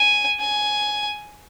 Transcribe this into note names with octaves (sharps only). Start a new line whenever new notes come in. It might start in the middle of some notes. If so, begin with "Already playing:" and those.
Already playing: G#5
G#5